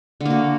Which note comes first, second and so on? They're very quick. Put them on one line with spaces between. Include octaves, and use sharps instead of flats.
D3 A#3 F#4